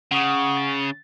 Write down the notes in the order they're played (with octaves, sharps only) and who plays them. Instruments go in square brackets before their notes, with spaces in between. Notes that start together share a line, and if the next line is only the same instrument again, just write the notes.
[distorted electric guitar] C#3 [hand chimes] F#5 C#6 D#6
[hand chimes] A6